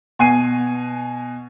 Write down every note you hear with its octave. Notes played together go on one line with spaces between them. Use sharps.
B2 G#5 C7 D#7